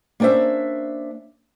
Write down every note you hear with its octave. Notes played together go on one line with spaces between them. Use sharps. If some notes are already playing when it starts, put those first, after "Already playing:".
A#3 C#4 D4 C5 E5